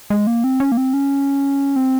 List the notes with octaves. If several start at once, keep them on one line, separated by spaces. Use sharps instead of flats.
G#3
A#3
C4
C#4
A#3
C4
C#4
C4